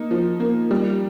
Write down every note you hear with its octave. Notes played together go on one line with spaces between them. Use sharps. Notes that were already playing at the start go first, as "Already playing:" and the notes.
Already playing: A#3 D#4
F3
A#3
G3